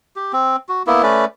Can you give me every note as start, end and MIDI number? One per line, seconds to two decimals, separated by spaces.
0.16 0.32 67
0.33 0.56 60
0.69 0.83 66
0.87 1.02 58
0.87 1.02 59
0.87 1.02 64
1.03 1.25 57
1.03 1.25 61
1.03 1.25 71
1.03 1.25 74